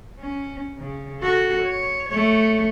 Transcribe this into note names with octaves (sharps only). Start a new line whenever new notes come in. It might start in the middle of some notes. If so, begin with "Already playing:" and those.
C#4
C#3
F#4 A4
C#5
A3 C#5